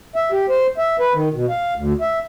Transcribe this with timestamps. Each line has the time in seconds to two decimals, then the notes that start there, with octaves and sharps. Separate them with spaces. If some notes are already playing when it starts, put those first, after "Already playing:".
0.16 E5
0.32 G4
0.49 C5
0.78 E5
1.00 B4
1.14 D#3
1.33 B2
1.50 F5
1.76 D2
2.01 E5